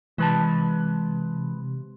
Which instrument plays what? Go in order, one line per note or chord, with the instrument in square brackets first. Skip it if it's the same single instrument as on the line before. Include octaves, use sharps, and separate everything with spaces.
[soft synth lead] C3 [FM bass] E3 [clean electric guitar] G#3 B4 A5